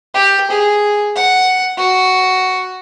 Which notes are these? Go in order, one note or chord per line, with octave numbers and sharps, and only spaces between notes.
G4
G#4
F#5
F#4